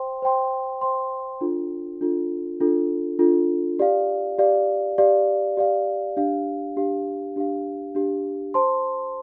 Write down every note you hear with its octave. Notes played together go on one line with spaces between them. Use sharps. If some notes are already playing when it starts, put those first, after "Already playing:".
Already playing: C5 G5 C6
C5 G5 C6
C5 G5 C6
D4 F4 A4
D4 F4 A4
D4 F4 A4
D4 F4 A4
G4 D5 F5
G4 D5 F5
G4 D5 F5
G4 D5 F5
D4 G4 F5
D4 G4 F5
D4 G4 F5
D4 G4 F5
C5 A5 C6